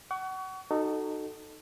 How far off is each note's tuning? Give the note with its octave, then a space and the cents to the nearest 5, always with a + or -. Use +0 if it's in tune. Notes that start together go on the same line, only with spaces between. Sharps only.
F#5 +30 C#6 +30
D#4 -20 F#4 +25 A4 +0